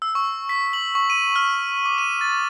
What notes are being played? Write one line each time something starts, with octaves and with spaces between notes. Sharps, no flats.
E6
C#6
B6
F#7
C#6
D#7
F6
D6
D#7
A6